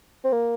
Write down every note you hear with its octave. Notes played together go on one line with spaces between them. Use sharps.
C4
A#3